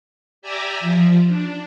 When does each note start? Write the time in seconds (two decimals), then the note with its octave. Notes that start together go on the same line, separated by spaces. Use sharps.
0.42 G4 D5 E5 G#5 A#5
0.80 F3
1.28 D4